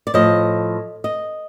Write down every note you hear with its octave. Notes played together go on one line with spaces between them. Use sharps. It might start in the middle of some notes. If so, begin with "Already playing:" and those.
D5
A2 F3 D#5
D#5